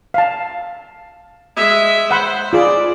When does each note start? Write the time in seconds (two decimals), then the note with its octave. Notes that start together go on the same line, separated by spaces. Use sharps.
0.14 F5 A5
1.56 G#3 E5
2.11 C5 F#5 B5 C6
2.53 F4 G#4 D5